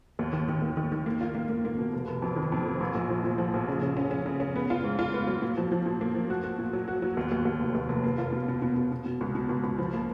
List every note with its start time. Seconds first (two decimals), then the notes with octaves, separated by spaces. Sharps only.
0.19 D#2
0.33 D#3
0.48 D#3
0.62 D#2
0.77 D#3
0.92 D#3
1.06 A#3
1.21 F4
1.35 A#3
1.49 A#3
1.65 A#3
1.78 B2
1.93 F1
2.07 F1
2.22 F2
2.36 D#3
2.52 F2
2.66 F1
2.81 A#1
2.95 A#1
3.09 F3
3.24 A#2
3.38 F3
3.54 A#1
3.68 C#3
3.82 C#3
3.97 C#4
4.11 C#4
4.26 C#3
4.40 C#4
4.56 B3
4.70 F4
4.84 G#2
4.99 F4
5.14 B3
5.27 F#3
5.42 A#2
5.57 F3
5.72 F3
5.86 A#2
6.01 A#3
6.15 F3
6.30 F#4
6.44 F#4
6.59 A#2
6.73 F#3
6.88 F#4
7.02 F#3
7.17 D#2
7.32 D#2
7.45 D#2
7.60 F1
7.75 D#2
7.89 F1
8.04 A#3
8.18 F4
8.32 B2
8.48 B2
8.62 B2
8.77 B2
8.92 B2
9.05 B2
9.21 C#2
9.35 B2
9.49 C#2
9.64 C#2
9.78 F3
9.93 A#3